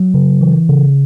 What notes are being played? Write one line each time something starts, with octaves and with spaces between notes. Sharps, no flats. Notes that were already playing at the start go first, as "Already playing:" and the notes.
Already playing: F#3
C#3
E3
C#3